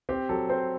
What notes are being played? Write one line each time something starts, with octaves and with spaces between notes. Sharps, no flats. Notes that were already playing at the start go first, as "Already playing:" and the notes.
C4 G4
F#3 A4
C4 C5